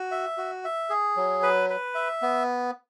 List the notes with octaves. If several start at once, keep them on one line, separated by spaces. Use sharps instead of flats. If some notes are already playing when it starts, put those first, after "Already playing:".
Already playing: F#4
E5
F#4
E5
G#4
F#3
B4
B4
E5
B3